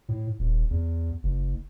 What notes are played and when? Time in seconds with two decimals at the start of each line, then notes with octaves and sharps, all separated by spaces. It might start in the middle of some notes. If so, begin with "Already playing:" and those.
0.09 A2
0.39 D#1
0.70 E2
1.23 F#1